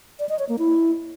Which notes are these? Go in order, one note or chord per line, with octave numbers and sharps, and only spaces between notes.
D5
D#5
C#5
A#3
E4